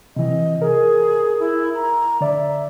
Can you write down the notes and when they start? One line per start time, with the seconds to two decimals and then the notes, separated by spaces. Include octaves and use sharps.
0.16 C3 E3 D#5
0.62 G#4 A#4
1.39 E4
1.74 A#5
2.21 D3 D5 E5